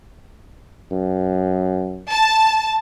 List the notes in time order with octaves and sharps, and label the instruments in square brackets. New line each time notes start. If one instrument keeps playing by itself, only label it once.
[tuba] F#2
[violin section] A5